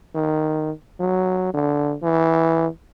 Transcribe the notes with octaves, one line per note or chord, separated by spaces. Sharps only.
D#3
F#3
D3
E3